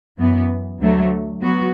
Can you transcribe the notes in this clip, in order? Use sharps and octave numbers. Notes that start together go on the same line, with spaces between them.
F#2 E3 B3
D2 D3 F#3 A3
F#3 B3 F#4